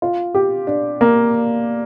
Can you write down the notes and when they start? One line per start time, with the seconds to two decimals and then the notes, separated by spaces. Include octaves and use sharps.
0.02 F4
0.35 G4
0.67 D4
1.01 A#3